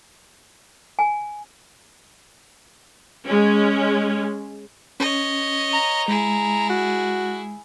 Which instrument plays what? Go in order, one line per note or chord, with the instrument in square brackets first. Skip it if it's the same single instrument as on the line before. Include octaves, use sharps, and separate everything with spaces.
[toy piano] G#5
[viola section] G#3 C#4
[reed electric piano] C#4 [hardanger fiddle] C#5 D#5
[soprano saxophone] A#5
[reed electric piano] G#3 [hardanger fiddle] E4 G#4
[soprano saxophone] F#4